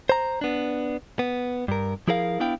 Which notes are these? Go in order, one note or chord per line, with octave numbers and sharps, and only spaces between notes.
C5 A#5
B3 D4
B3
G2 A#4
F3 E4 G#4 A#4 D#5 F5
B3 D4 E4 F5 G5